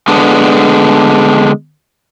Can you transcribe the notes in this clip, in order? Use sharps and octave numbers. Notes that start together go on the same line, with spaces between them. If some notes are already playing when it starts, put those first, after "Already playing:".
D3 G#3 B3 D4